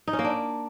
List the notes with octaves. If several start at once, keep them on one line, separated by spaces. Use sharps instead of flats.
D#4
C#4
A#3
D4